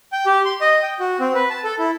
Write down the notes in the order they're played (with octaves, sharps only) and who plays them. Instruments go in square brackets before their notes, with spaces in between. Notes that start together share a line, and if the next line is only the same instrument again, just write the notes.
[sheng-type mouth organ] G5
G4
C6
D#5
G5
F#4
C4
B4
A5
A4
E4